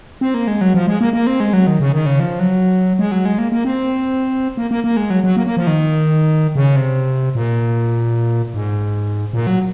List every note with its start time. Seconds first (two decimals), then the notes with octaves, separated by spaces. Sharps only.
0.21 C4
0.34 A#3
0.47 G#3
0.61 F#3
0.74 F3
0.87 G#3
1.01 A#3
1.13 A#3
1.27 C4
1.40 G#3
1.53 F#3
1.67 D#3
1.80 C#3
1.92 D#3
2.06 C#3
2.20 F3
2.40 F#3
2.99 G#3
3.12 F#3
3.25 G#3
3.38 A#3
3.52 A#3
3.65 C4
4.57 A#3
4.71 A#3
4.84 A#3
4.97 G#3
5.10 F#3
5.24 F#3
5.37 A#3
5.47 A#3
5.57 F3
5.67 D#3
6.55 C#3
6.76 C3
7.35 A#2
8.54 G#2
9.33 A#2
9.47 F#3